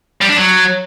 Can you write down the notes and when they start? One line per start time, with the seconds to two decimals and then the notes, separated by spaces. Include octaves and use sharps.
0.21 G3
0.29 D4
0.37 F#3